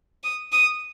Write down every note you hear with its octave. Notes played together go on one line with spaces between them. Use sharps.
D#6
D#6